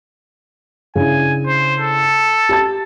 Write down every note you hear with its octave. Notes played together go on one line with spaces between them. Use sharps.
C#3 D4 E4 G#5
C5
A4
G4 A5 A6